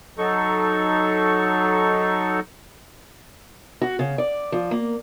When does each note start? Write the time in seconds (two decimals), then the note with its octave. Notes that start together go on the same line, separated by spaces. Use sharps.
0.18 F#3 D#4 A4 C#6
3.82 F#4
3.99 C#3
4.18 D5
4.52 F3
4.71 A#3